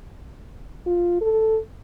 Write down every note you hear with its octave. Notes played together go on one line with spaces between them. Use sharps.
F4
A4